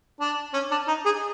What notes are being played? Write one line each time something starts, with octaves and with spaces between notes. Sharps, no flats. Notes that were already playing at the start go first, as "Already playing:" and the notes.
D4
C#4
D4
D#4
G#4